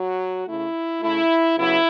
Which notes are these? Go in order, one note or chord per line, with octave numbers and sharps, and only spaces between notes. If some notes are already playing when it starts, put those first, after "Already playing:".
Already playing: F#3 F#4
C#3 A3 E4
C#3 A3 E4
C#3 F#3 B3 E4